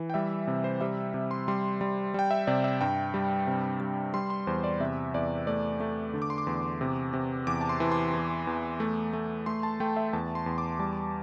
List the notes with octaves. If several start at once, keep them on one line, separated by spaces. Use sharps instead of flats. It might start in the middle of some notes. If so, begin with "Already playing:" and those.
Already playing: E3
G5
G3 E5
C3
C5
G3 E5
C3
C6
G3 C6
G3
G3 G5
E5
C3 D5
E5
G2 G5
G3
C3
G3
G3 C6
C6
E2 C5
D5
C3 E5
E2 D5
A3 D5
A3
D3
D6
C6
D6
E2
C3
C3
E2 D6
A5
C6
E3
C6
E2
E2
A3
A3
A3 C6
A5
A3 G5
E5
E2 A5
C6
E2
D6
G3 A5